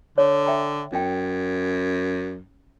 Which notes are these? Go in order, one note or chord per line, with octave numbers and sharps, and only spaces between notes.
D3 C#5
E5 G5 A#5
F#2 C#4 G5